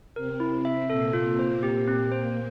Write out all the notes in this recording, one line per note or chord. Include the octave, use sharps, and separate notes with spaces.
C3 C4 A#4
E4
E5
A#2 A#3 A4
F4
A#2 A#3
C5
A#2 A#3 G4
C4
C5